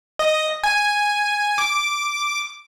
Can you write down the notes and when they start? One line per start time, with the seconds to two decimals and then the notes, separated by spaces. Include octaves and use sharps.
0.19 D#5
0.64 G#5
1.58 D6